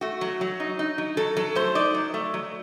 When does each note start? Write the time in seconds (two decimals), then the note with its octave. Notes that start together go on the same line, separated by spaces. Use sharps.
0.01 A3 F#4
0.21 F#3
0.41 F#3
0.60 D#4
0.79 D#4
0.98 F#3
1.17 F#3 A4
1.37 F#3 A4
1.55 A3 C5
1.75 D#4 D5
1.95 F#3
2.14 A3
2.34 F#3